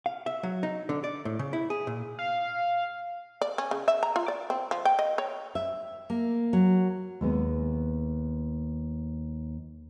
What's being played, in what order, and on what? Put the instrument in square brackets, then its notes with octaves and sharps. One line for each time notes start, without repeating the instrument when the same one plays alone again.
[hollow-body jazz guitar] F5
E5
F#3
D#4
D3
D5
A2
C#3
E4
G#4
A#2
[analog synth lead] F5
[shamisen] D5
C#4
C#3
E5
A#5
F4
D5
C4
F3
G5
D#5
C#5
[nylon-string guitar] E5
A#3
F#3
D#2 G#3 B3